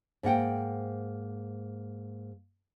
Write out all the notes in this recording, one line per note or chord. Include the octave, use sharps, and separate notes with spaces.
G#2 A#3 F#5 G5